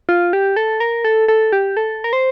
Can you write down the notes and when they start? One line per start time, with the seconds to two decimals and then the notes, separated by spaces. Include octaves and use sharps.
0.09 F4
0.33 G4
0.56 A4
0.80 A#4
1.05 A4
1.28 A4
1.53 G4
1.77 A4
2.04 A#4
2.13 C5